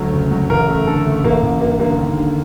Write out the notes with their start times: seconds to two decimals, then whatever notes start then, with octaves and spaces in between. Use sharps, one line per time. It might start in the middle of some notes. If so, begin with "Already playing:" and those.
Already playing: D2 F#3 A3
0.12 F#1
0.31 F#3
0.49 A1 A#4
0.68 A3
0.87 D3 A4
1.06 A3
1.19 A3
1.24 A1 A#3
1.42 A1
1.61 G2 A#3
1.80 D3 A#3
1.99 D#2
2.17 D3